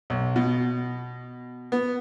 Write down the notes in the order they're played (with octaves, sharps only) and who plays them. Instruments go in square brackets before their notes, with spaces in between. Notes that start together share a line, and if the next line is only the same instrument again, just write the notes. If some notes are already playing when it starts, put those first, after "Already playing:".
[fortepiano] B1
B2
B3